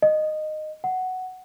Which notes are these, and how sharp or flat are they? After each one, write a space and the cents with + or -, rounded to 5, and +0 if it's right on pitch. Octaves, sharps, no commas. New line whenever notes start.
D#5 -15
F#5 +5